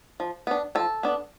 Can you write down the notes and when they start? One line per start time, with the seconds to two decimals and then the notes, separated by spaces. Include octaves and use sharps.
0.20 F3
0.47 B3 D4
0.75 F3 A4
1.03 B3 D4